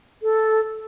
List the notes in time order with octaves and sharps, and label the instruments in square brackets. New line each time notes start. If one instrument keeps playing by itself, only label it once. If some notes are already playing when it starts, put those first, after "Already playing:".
[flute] A4